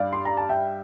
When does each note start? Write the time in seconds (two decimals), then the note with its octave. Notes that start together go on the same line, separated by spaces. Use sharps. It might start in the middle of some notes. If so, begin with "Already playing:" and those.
Already playing: G2 G3 D5 F5
0.13 C6
0.25 A#5
0.37 A5
0.49 E5 G5